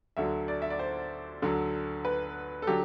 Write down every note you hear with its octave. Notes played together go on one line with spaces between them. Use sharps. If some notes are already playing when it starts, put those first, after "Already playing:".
D2 D3 F#3 E5
D5
E5
D5
C5
D2 D3 F#3
B4
A4
D3 F#3 G4